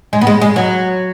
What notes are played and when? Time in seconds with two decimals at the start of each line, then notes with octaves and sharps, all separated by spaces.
0.13 G#3
0.21 B3
0.27 G#3
0.41 G#3
0.56 F#3